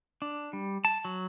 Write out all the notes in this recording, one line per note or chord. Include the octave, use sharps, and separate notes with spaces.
D4
G3
A5
F#3